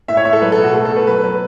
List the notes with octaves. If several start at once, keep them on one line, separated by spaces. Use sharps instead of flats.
A2 E5
C#5
A2 E5
A4
F#3 B4
A4
B2
F#4
A3 A4
A4
B2
B4
F#3 B4
F#3 B4